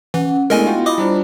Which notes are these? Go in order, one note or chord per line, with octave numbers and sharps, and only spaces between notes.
E3 C#4 F#5
G#3 A3 B3 D4 E4 A#4 D#5 G#5
F4 F#4 G5
E4 D#5 B5 D6 D#6
G3 D4 F4 C5 A#5